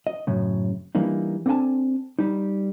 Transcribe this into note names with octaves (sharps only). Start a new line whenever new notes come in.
D#5
F#2 A2 C#3
E3 G3 A#3 D4 D#4
C4 D4 A4 F#5 G#5 A5
G3 D#4